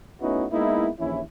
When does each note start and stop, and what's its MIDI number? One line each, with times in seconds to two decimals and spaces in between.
0.22 0.46 57
0.22 0.46 59
0.22 0.46 61
0.22 0.46 63
0.22 0.46 64
0.22 0.46 66
0.52 0.89 56
0.52 0.89 58
0.52 0.89 59
0.52 0.89 63
0.52 0.89 64
0.99 1.21 34
0.99 1.21 39
0.99 1.21 52
0.99 1.21 61
0.99 1.21 64